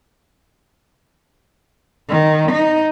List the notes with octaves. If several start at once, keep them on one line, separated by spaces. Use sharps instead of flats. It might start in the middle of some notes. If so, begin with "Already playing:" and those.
D#3
D#4